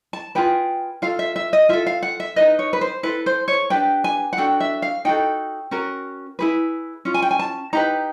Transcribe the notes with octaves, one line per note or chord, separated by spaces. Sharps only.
A5
F4 G#4 B4 G5
F4 A4 F5
E5
E5
D#5
F4 A4 E5
F5
F#5
E5
D#4 G#4 B4 D#5
C#5
B4
C5
E4 A4 B4
C5
C#5
D4 G4 B4 G5
G#5
F#5
D4 F#4 A4 G5
E5
F5
D#4 F#4 A4 G5
C#4 F#4 A#4
E4 G#4 B4
C#4 F4
G#5
G5
G#5
A5
D#4 G4 B4 A#5